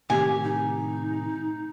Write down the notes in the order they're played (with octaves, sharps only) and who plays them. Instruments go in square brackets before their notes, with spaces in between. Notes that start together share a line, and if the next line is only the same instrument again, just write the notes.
[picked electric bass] A2 C3 D#3 [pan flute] G4 [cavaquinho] G#5
[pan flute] D#4